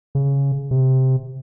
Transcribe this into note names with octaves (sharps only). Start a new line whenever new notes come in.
C#3
C3